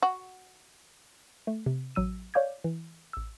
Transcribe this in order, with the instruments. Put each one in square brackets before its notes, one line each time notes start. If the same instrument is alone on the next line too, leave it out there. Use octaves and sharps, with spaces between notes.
[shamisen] F#4
[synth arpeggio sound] A3
C3
A1 F#3 E6 D#7
C#5 D5 F5 D6 G6 G#6
E3
A1 E6